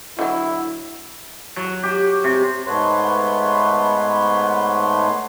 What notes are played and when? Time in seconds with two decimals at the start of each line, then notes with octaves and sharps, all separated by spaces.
0.19 D3 F#3 E4
1.56 F#3
1.83 G4
2.24 C3
2.67 G#2 A3 B3 B4 C#5 C6